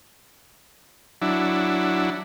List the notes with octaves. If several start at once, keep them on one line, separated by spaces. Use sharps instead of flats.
F#3 D4 E4